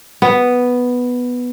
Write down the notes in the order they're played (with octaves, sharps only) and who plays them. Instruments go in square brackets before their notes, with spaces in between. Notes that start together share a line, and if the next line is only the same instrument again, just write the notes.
[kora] B3